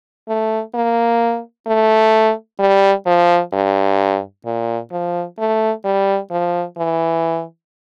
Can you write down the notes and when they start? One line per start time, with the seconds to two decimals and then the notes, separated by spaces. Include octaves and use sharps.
0.28 A3
0.75 A#3
1.67 A3
2.59 G3
3.07 F3
3.53 G2
4.46 A#2
4.92 F3
5.39 A3
5.85 G3
6.31 F3
6.77 E3